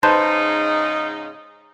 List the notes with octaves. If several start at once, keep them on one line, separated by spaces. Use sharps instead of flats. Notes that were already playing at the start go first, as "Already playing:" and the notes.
G#2 C#3 D#4 B4 C5 A5